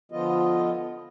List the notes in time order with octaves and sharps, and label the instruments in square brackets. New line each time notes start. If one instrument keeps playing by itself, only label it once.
[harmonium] D3 F3 B3 F4 D#5